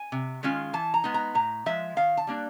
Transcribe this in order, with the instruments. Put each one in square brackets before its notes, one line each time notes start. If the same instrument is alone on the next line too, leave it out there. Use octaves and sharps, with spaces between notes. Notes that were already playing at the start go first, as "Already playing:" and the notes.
Already playing: [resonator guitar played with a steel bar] G#5
C3
D#3 G#3 C#4 F4
E3 A5
A#5
G#3 B3 D#4
A#5
A2 A#5
F3 G#3 E5
D#3 F5
A5
G3 A#3 D4